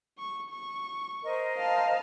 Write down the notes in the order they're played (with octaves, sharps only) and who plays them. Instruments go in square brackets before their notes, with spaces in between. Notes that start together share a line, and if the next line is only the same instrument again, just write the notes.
[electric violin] C#6
C#6
[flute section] A#4 C5 D#5
[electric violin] F5 A5